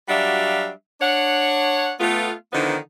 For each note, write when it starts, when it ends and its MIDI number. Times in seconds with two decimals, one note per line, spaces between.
0.09 0.69 54
0.09 0.69 55
0.09 0.69 62
0.09 0.69 66
0.09 0.69 76
0.09 0.69 77
1.01 1.91 62
1.01 1.91 73
1.01 1.91 78
2.00 2.33 57
2.00 2.33 59
2.00 2.33 65
2.53 2.76 50
2.53 2.76 51
2.53 2.76 53
2.53 2.76 59
2.53 2.76 63
2.53 2.76 64